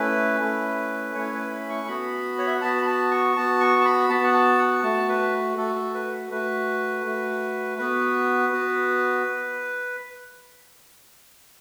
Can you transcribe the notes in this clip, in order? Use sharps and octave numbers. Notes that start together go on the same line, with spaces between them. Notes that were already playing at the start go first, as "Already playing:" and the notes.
Already playing: A3 C#4 E4 B4
A3 C#4 E4
A3 C#4 E4 C#5
B4
B5
C#6
B3 F#4 B5
C#5
E5
F#5
B3 F#4 A5
B5
A5
C#6
B3 F#4 A5
C#6
A5
B5
B3 F#4 A5
F#5
A5
F#5
A3 F#4 A5
B4
A3 F#4 A4
A4
B4
A3 F#4 B4
A3 F#4
B3 F#4 B4
B3 F#4